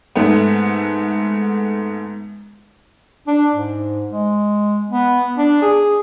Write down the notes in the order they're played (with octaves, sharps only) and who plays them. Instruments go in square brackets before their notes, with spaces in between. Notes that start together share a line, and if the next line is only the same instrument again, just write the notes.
[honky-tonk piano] G#2 A3 B3
[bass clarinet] D4
G#2
G#3
B3
D4
G#4